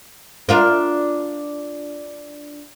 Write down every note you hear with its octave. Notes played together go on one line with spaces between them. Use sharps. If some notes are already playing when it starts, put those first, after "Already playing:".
D4 F4 A#4